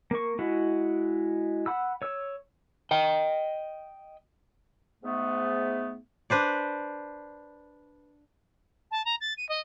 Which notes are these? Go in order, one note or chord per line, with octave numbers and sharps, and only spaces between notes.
A#3 C#6
G#3 E4 F#4
F#5 B5 E6
C#5 E6
D#5 G5
G#2 A3 B3
D4 B4 C5 D5
A5
A#5
A6
D#7
D#5